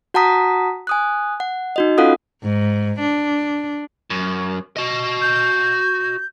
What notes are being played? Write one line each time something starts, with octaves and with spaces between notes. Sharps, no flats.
F#4 F#5 A5 A#5 D#6 B6
G#5 D#6 F#6
F#5
D#4 F#4 D#5
C#4 F4 A4 F5 F#5 D#6
G#2
D4
F#2
F#4 D#5
G6